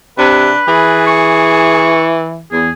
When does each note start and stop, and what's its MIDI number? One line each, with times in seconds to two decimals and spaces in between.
0.18 0.51 48
0.18 0.62 62
0.18 1.05 71
0.68 2.45 52
0.68 1.94 68
1.07 2.10 85
2.52 2.71 40
2.52 2.70 68